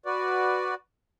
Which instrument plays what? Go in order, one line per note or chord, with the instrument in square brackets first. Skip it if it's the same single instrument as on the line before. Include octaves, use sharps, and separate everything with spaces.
[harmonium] F#4 B4 D5